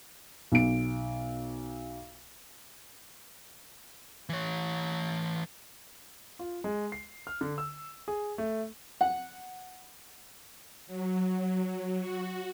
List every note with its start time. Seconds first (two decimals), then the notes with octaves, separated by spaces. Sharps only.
0.52 B1 D7
4.29 E3 C#5
6.39 F4
6.64 G#3
6.92 C7
7.27 F6
7.41 D3
7.58 E6
8.08 G#4
8.38 A3
9.01 F#5
10.87 F#3
11.99 F#4